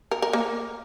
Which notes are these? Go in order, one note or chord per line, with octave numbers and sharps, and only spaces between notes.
A#4
A#4
A#3